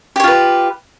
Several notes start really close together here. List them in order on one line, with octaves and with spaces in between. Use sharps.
G4 C#5 F4 B4